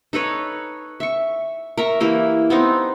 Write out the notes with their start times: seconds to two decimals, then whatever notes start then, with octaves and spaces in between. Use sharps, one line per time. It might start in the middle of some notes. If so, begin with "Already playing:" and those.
0.13 D#4 A4 B4 C#5
1.00 E5 C#6
1.77 A#4 E5 C#6
2.00 E3 A#3 E4 G4
2.50 B3 C4 D#4